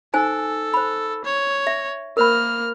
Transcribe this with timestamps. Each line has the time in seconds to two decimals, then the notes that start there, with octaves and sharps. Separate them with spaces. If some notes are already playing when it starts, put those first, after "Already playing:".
0.14 D#4 A4 C5 G#5
0.74 C5 B5
1.25 C#5
1.67 E5
2.17 A#3 A#4 C5 B5 F6